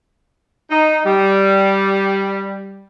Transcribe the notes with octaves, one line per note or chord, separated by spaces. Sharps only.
D#4
G3